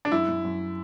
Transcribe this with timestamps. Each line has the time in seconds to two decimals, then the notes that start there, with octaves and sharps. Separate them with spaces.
0.05 D4
0.12 F#2 E4
0.28 F#2
0.44 F#2